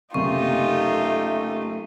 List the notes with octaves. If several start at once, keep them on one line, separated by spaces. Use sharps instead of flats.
F#1 C3 A3 D#4 F4 G4 C#6